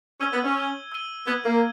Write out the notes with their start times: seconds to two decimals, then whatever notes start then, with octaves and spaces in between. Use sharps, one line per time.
0.21 C#4 E6 G#6 D#7 G7
0.33 B3
0.44 C#4
0.55 E6 G#6 D#7 G7
0.92 E6 G#6 D#7 G7
1.27 B3 E6 G#6 D#7 G7
1.45 A#3